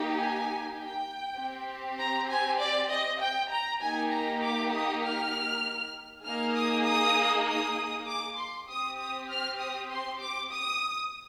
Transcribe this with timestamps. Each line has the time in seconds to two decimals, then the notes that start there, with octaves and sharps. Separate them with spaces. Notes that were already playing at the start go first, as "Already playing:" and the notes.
Already playing: A#3 D#4 G4
0.15 G#5
0.77 G5
1.38 C4 G4
1.99 A#5
2.29 G#5
2.58 D5
2.89 D#5
3.21 G5
3.50 A#5
3.81 A#3 D#4 G4 G#5
4.11 A#5
4.42 D6
4.72 D#6
5.02 F6
6.24 A#3 D#4 G#4 F6
6.55 D#6
6.85 D#6
7.47 D#6
8.07 D6
8.37 C6
8.68 C4 G4 D#6
8.98 D#6
9.29 F6
9.59 D#6
9.89 C6
10.21 D6
10.51 D#6